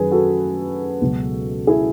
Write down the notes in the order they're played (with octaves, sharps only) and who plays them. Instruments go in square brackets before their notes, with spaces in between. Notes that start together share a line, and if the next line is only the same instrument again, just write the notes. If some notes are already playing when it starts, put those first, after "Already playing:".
Already playing: [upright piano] F#2 D#3 F#3 G#4 B4
F#4 A4
C#2 B2 F#3
E4 G#4